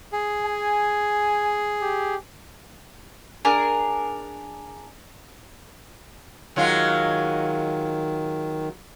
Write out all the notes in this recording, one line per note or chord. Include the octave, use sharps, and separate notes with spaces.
G#4
G#5
G4
D4 G#4 A#4
D#3 F#3 G#3 F4